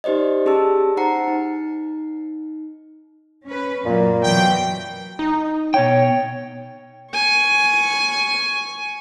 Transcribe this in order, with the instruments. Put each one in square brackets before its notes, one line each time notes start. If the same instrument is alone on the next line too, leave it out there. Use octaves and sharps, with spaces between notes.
[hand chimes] D#4 G4 C5 D5 D#5
C#4 G4 G#4 A5 E6
D#4 C5 F#5 A#5 C7 C#7
D#4
[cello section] C#4 B4
[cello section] F#2 A#3 [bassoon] A#2
[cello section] B2 E3 F#3 [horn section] G5
[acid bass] D#4
[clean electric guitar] B2 G5 [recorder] C#5
[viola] G#5 C#6